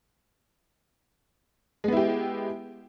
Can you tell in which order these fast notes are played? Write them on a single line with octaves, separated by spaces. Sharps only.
G#3 B3 E4 G4